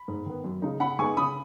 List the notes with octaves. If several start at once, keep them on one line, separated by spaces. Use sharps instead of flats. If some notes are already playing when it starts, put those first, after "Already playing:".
Already playing: B5
G#2
D#3 B3
F#2
C#3 G#3 D#4
C#3 F#5 B5
G#3 B3 D#4 G#5 C#6
C#3 B5 D#6